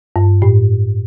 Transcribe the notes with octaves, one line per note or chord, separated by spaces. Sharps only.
G2
A2